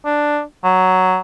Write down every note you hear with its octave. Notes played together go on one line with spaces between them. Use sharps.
D4
F#3